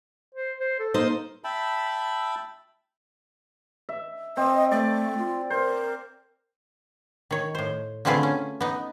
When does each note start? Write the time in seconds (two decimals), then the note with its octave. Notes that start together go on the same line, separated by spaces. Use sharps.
0.35 C5
0.60 C5
0.79 A4
0.94 A#3 D#4 C5
1.44 E5 G5 A5 B5
3.89 E5
4.37 C4 D#5
4.72 A3 D5
5.18 F4
5.50 A#4 C5
7.31 D#3 C#5
7.55 A2 C5
8.05 D3 A3 C4 F4 G#4 B4
8.23 C#4
8.61 B3 D#4